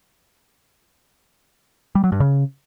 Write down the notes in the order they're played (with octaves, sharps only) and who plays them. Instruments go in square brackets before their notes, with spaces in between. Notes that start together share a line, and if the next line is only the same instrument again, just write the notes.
[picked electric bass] G3
F#3
G2
C#3